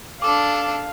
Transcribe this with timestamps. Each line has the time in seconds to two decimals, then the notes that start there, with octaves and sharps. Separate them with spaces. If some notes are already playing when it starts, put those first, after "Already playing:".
0.22 D4 A4 F5 D6